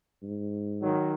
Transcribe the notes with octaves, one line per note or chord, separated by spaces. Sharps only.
G#2
D#3 F#3